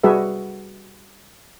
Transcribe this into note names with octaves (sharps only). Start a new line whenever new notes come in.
G3 F#4 G#4 B4 E5